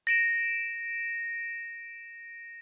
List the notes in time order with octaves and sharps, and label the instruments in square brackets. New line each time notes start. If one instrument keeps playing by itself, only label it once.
[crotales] A#6 D7 E7